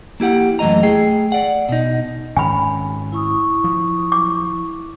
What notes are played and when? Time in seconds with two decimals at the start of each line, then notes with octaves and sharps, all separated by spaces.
0.20 A#3 E4 G4 F#5
0.59 F#2 E3 A3 D#5 A#5
0.83 A3 G#4 G5
1.32 D5 F#5
1.69 B2 D#4
2.37 G#2 D#3 C#4 G#5 B5
3.12 E4 C#6 D#6
3.64 F3
4.12 D6